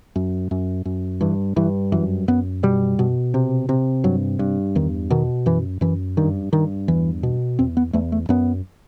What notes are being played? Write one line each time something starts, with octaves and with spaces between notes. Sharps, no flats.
F#2
F#2
F#2
G2 E3
G2 E3
F#2 E3
F#2 B3
B2 G3
B2
C3
C3
G2 F#3
G2
E2 D#3
B2 D#3
F#2 E3
F#2 E3
G2 D#3
G2 D#3
E2 E3
B2
E2 C4
B3
E2 A3
A3
F#2 B3